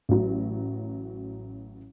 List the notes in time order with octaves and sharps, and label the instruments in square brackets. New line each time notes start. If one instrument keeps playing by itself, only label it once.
[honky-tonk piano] A1 F#3